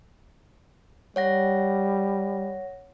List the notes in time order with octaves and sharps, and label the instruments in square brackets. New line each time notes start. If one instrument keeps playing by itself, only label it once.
[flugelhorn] G3 [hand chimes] C#5 F#5 A#6